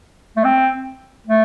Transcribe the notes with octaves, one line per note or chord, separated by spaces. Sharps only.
A3
C4
A3